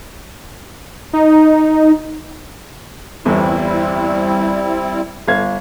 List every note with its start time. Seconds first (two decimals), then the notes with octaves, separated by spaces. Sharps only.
1.13 D#4
3.25 G1 E2 G3 C4 E4
5.28 G1 F5 G#6